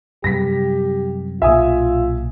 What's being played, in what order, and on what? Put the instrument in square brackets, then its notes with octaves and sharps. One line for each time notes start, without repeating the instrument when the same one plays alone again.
[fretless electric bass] F#2 C3 G3 [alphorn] G4 [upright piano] A#6 B6
[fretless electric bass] B1 A#2 [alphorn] F4 [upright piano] E5 G#5 D#6